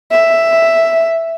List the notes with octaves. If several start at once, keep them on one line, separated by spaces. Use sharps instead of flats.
E5